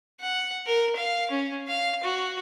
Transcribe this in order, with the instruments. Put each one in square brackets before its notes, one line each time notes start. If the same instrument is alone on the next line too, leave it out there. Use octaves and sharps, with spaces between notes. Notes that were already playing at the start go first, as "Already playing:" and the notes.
[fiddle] F#5
A#4
F5
C#4
F5
F#4